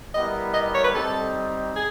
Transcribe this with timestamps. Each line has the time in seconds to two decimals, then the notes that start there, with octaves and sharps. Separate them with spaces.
0.14 G3 B3 E4 G4 A#4 D#5
0.54 D#5
0.74 C#5
0.84 B4
0.94 G3 C4 D#4 A4
1.75 G#4